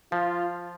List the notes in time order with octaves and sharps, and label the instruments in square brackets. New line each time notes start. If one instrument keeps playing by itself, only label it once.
[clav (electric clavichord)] F3 [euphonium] F4